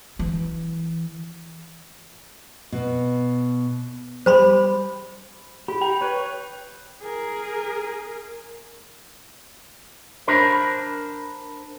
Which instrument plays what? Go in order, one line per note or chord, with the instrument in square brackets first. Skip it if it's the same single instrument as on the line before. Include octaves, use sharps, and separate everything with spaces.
[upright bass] E3
[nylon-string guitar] B2
[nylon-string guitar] G3 [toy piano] C5 B5 C6
[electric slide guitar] G4 [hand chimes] B5
[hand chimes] G5 [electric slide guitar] A#5
[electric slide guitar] B4 C#5
[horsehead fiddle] G#4 A#4
[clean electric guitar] D4 A#4 C5 B5